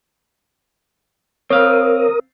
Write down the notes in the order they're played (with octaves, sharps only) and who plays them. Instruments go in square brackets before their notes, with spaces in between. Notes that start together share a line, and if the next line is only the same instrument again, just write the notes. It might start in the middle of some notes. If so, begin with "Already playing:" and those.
[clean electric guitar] C4 F5 [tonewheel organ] A#4 D#6 [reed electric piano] C#5